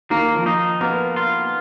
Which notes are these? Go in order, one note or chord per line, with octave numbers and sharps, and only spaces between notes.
D#3 A#3
F3
D#4
A#3 B3
F4